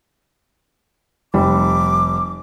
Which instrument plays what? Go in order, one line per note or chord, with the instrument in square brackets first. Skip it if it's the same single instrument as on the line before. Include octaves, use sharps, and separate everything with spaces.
[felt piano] F1 G3 [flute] D6